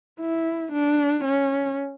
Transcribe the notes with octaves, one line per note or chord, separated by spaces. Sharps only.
E4
D4
C#4